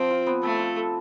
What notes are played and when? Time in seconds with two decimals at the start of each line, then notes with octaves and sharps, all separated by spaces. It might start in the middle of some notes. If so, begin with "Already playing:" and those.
Already playing: F3 C4
0.11 F4
0.27 B3
0.43 A3 C4
0.59 F4
0.77 A4